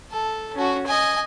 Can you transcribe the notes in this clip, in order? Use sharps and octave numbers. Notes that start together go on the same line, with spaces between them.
A4
C#4 F#4
D#5 G#5